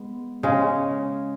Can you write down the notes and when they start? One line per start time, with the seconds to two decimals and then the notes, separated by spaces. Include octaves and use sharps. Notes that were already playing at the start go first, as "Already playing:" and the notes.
Already playing: G#3 B3
0.43 C#3 G#3 C#4